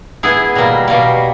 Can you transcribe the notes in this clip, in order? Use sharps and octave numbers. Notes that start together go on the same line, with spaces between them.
B3 E4 G#4
B2 G3 A#3
B2 G3 A#3